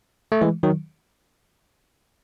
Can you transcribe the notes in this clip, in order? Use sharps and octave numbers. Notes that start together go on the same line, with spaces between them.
A3
E3 G#3
D#3 F#3